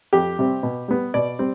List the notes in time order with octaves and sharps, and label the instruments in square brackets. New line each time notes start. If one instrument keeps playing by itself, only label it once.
[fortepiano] F2 G4
C3 G3 C4
B2
G3 B3
B2 D5
G3 C4